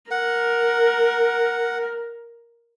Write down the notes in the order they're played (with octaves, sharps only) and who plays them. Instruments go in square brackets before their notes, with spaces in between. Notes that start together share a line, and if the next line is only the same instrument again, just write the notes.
[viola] A#4 [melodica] F#5